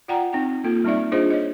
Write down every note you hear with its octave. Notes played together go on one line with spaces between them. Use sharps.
F4 D5 F#5 G5 A#5
C4 D#4 G5
A#3 F4 A4
G3 C4 D#4 D5 E5
D4 F4 G#4 C5 D#5
C#5 D#5